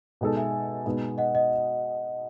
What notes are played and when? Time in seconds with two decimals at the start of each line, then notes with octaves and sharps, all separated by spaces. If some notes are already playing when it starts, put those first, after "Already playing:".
0.21 B2 G#3 D#4 A4
0.37 E5 G#5
0.86 B2 G#3 B3 D#4 G#4
1.18 D#5 F#5
1.35 D#5 F#5